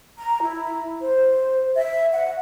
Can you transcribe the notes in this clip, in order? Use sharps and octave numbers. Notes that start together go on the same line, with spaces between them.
A#5
E4
C5
E5
F#5